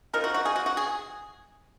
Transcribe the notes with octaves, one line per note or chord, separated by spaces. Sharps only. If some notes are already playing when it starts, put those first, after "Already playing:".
F3 G#3 D#4 A#4
F#4
F#4
G#4
F#4
F#4
G#4